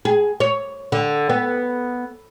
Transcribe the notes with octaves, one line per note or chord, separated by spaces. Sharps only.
G#4
C#5
D3
B3